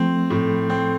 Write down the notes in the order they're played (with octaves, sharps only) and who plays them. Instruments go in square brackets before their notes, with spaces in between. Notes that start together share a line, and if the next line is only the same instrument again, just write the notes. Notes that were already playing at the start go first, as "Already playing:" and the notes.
Already playing: [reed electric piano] F3 A3 [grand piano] C4
[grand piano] A2
C4